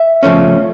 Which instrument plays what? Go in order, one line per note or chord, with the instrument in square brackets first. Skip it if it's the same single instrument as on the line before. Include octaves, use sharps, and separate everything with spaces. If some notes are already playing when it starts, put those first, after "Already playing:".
Already playing: [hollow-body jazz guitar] E5
C#3 F3 A3 C#4